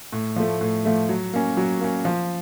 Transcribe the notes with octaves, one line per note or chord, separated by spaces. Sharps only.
A2
F3 A3
A2
F3 A3
F#3
A#3 C#4
F#3
A#3 C#4
F3